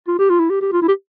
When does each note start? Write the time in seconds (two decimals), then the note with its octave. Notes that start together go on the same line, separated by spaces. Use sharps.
0.07 F4
0.19 G4
0.29 F4
0.39 E4
0.50 G4
0.61 G4
0.72 F4
0.82 E4
0.88 G4